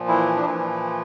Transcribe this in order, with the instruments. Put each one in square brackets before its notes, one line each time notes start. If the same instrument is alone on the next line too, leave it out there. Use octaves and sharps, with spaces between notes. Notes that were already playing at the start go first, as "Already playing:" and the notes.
Already playing: [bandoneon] A#2 F3
E3 E4
D4
A#2 E3 F3 E4